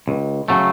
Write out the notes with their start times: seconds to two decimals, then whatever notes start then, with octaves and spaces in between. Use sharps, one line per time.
0.08 C#2
0.48 C#3 F#3 A3